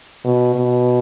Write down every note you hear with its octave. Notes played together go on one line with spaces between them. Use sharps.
B2
B2